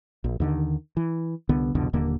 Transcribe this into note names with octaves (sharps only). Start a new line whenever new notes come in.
A#1
D#2 D3 D#3
E3
C2 D3 B3
C2 F2 B2 D3
D#1 D#2 D3 A#3